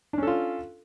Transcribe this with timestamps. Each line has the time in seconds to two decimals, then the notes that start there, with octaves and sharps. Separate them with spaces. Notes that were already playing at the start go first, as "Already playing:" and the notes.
0.13 D4
0.18 C#4
0.23 A4
0.27 F4